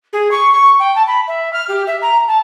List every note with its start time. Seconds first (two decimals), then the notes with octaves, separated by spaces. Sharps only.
0.13 G#4
0.31 C#6
0.53 C#6
0.79 G5
0.95 A5
1.07 B5
1.27 E5
1.53 F6
1.68 G4
1.87 E5
2.02 A#5
2.28 A5